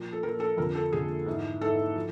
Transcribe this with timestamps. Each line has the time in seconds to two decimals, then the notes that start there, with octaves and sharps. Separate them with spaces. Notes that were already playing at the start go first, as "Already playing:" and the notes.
Already playing: A#2 F3
0.13 A4
0.23 A#2 F3 A#4
0.40 A4
0.57 F2 D3 F3 A#4
0.75 A4
0.92 F2 D3 F3 G#4
1.26 G#2 E3
1.61 G#2 E3 A4
1.96 F3